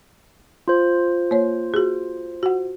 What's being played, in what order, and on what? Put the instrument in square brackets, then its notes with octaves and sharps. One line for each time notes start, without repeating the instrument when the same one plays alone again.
[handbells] F4 C5
[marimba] A#3 C#5
F#4 G#4
F#4 F#5